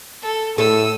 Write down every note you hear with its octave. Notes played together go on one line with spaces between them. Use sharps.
A4
A2 A4 D#6 E6